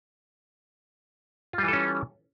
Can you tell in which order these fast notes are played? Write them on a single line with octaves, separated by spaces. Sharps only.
F4 G3 E3 A4 C#4